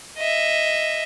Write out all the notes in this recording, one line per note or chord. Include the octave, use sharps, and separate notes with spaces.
D#5 E5